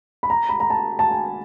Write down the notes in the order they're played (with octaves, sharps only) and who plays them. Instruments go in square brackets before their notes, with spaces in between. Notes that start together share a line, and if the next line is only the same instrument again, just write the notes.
[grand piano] B5
A#5
B5
A#5
A5
A5
G#5